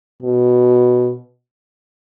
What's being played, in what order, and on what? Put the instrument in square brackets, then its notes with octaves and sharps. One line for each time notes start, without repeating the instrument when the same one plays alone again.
[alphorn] B2